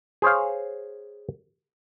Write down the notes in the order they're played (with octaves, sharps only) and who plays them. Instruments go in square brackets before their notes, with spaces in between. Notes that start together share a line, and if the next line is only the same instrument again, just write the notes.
[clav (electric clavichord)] G#4 C5 C#5 F5